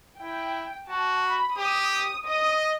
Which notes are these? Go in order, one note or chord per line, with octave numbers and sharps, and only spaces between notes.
E4 G5
F#4 A5
B5
G4 D#6
D#6
D#5 D#6